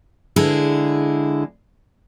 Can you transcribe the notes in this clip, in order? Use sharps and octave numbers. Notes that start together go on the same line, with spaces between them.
D3 G#3 E4